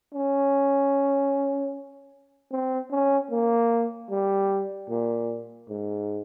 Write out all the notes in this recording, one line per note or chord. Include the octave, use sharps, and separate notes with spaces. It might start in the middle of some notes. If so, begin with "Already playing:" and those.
C#4
C4
C#4
A#3
G3
A#2
G#2